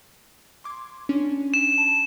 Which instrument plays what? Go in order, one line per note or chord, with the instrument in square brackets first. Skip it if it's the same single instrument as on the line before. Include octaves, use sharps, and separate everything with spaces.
[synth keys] C6 D6 G#6
C#4 D4
[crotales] E7
[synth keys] A5